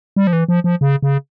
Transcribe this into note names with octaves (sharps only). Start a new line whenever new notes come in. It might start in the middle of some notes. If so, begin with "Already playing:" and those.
G3
F3
E3
F3
F3
C#3
C#3